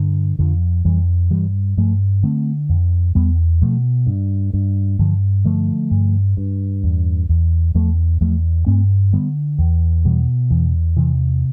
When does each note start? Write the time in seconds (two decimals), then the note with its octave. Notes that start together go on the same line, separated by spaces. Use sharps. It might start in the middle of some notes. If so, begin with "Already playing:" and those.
Already playing: G2 D3
0.39 F2 D3 F3
0.85 F2 E3 G3
1.31 G2 E3 G3
1.77 G2 F3 A3
2.23 D3 A3 C4
2.69 F2
3.15 E2 G3 B3
3.62 B2 F3 A3
4.07 G2
4.54 G2
4.99 G2 D3 F3
5.45 D3 F3 A3
5.91 G2
6.37 G2
6.83 E2
7.29 E2
7.75 E2 F3 A3
8.21 E2 F3 A3
8.66 G2 A3 C4
9.13 D3 G3 B3
9.58 E2
10.05 B2 E3 G3
10.50 E2 E3
10.97 C3 E3